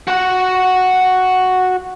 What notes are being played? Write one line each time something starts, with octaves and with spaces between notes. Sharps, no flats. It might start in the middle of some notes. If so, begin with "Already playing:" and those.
F#4 F#5